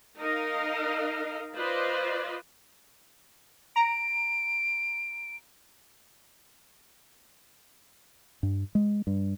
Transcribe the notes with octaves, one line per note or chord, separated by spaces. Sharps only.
D#4 A#4 D#5 F5
F4 B4 C5 D5 D#5
A#5 D7
G2
G#3
G2